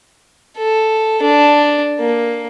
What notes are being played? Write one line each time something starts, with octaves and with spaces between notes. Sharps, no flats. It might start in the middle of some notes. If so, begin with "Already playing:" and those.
A4
D4
A#3